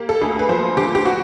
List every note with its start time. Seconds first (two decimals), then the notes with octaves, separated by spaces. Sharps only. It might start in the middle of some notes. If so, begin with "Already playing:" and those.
Already playing: A#3 G4
0.09 A4
0.21 D2 G#4
0.39 B4
0.49 F3 C5
0.77 D3 G4
0.95 G4
1.05 F#4